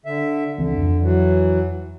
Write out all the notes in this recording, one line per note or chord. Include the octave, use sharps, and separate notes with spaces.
D3 E5
C#2 D3 E3 C4
F2
E3 F#3